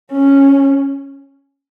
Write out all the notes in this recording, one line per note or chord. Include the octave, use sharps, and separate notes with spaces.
C#4